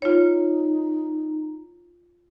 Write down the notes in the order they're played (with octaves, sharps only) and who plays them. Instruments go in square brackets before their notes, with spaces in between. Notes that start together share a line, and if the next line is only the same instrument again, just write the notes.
[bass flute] D#4 [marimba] F4 C#5